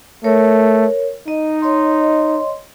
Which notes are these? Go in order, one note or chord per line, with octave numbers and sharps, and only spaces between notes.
A3 A#4 C#5
D#4 D#5
C#5 D#5 C6